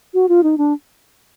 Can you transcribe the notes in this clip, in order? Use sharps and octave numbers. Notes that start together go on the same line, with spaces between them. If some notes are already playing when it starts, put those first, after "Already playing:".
F#4
F4
D#4
D4